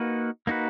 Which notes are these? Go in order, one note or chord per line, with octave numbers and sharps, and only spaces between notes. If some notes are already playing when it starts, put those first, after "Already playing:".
Already playing: A#3 D#4 F#4 B4
A#3 D#4 F#4 B4